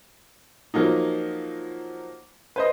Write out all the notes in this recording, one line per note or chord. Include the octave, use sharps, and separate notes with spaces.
F3 F#3 A#3 D#4
B4 C5 D#5